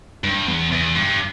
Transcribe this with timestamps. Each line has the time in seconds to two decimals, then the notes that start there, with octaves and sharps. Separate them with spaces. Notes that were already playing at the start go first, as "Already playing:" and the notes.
0.24 G2
0.47 E2
0.72 E2
0.95 G2